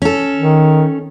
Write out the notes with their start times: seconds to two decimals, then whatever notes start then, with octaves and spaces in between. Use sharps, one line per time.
0.02 C#4 A4
0.37 D#3